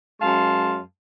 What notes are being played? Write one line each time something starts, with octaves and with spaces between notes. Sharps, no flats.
F#2 G#3 F5 A5 C6